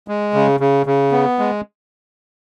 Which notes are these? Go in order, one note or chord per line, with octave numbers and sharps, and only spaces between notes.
G#3
C#3
C#3
C#3
B3
G#3